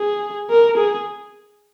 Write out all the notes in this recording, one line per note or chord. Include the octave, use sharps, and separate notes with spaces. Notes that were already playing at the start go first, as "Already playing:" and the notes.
Already playing: G#4
A#4
G#4